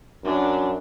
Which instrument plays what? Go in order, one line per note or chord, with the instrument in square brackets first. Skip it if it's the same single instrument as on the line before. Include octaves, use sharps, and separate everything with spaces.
[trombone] F#2 [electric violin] D4